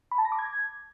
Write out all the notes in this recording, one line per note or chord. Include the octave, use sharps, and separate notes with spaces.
B5
A5
A#6
D6
G#6